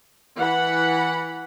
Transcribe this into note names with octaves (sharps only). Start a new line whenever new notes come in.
E3 F#5 B5